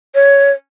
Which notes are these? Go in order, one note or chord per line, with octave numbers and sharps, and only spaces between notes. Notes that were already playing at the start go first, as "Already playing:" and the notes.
C#5